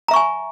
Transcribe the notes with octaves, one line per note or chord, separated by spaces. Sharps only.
E5 G#5 A#5 C#6